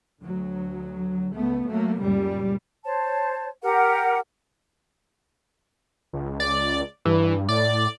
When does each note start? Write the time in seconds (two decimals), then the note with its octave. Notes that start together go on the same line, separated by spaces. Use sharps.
0.21 D2 F#3
1.36 C#2 A3 B3
1.68 F#3 A3 A#3
2.00 C#2 F#2 A#2 G3
2.85 C5 C#5 A5
3.63 G4 A#4 F#5
6.13 C#2
6.40 D5
7.05 G2 E3
7.49 A2 D5